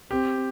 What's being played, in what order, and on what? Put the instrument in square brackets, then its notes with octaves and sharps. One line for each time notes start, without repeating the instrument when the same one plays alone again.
[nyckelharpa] C4 [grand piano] G4